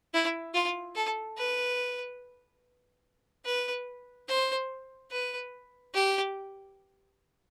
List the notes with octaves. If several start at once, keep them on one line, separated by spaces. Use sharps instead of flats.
E4
F4
A4
B4
B4
C5
B4
G4